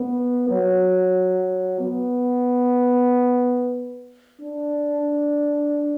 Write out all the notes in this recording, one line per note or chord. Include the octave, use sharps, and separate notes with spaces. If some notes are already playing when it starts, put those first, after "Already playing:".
Already playing: B3
F#3
B3
D4